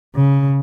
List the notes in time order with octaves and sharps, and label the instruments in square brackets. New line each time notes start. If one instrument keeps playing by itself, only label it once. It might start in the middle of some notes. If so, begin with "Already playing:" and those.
[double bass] C#3